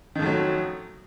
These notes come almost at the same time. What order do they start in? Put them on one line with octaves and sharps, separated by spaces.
D#3 F2 A3 F#3